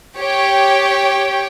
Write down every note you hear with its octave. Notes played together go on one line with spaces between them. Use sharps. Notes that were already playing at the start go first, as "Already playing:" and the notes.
G4 C#5 G5